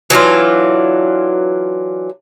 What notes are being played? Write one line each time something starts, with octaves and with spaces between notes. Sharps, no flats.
E3 F#3 D4 F4